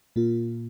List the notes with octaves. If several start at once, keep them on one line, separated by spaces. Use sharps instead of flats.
A#2 A#3 F4